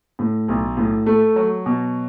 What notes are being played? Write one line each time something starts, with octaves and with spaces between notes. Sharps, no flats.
A2
B1
A2
A3
F#3
B2